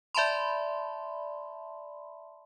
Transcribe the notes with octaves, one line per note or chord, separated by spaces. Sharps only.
D5 E5 A5 B5 C6